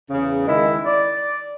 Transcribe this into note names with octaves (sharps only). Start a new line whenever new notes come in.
E2 C#3
D#3 G#3 E4
D5